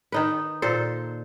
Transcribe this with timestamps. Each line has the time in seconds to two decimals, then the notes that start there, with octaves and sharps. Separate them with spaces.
0.12 D#3 D#4 B4
0.62 A#2 A4 C5